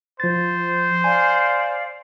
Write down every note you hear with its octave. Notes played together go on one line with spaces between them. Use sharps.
F3 C5 A6
D5 F5 G#5